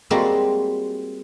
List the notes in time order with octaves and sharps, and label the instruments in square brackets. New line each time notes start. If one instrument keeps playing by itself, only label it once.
[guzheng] G3 G#3 A#3 C4 F#4 A#4